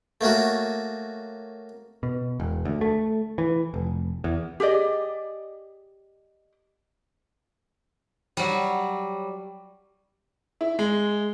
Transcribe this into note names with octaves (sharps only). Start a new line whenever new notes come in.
A3 A#3 C#4 F#4
B2
E1
D2
A3
E3
F1
E2
G4 G#4 D5 D#5
F#3 G3
E4
G#3